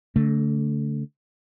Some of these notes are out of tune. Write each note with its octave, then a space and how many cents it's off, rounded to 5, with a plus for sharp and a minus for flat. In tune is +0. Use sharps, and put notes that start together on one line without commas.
D3 -40 A3 +0